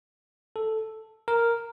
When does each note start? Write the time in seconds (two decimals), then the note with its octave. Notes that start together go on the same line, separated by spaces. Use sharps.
0.56 A4
1.28 A#4